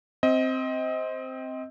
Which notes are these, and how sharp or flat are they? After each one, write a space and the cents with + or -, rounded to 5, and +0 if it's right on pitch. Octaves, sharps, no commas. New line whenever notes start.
C4 +0 D#5 +25